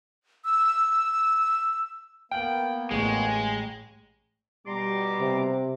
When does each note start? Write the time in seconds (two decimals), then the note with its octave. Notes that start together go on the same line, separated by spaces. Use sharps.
0.45 E6
2.32 A#3 B3 G5 F6 F#7
2.91 A1 G#3 G#4 G5 C#6
4.67 B2 G3 A#5 C6 D6
5.20 C3